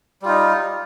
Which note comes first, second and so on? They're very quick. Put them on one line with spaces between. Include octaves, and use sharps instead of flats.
G3 F4 D#4